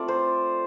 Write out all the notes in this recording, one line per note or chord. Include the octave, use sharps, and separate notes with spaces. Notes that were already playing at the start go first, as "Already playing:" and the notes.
Already playing: A3 C4 F4 D5
C5